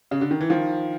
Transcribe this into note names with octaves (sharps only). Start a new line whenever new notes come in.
C#3
D3
D#3
E3
D#3 F3